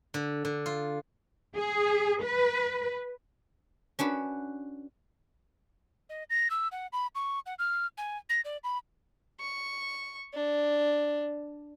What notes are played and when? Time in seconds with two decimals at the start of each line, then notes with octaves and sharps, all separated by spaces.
0.14 D3
0.45 D3
0.66 F4
1.56 G#4
2.22 B4
3.99 C#4 D4 F#4 B4
6.10 D#5
6.30 A#6
6.50 E6
6.72 F#5
6.93 B5
7.15 C#6
7.46 F#5
7.59 F6
7.98 G#5
8.30 A#6
8.45 D5
8.64 B5
9.40 C#6
10.34 D4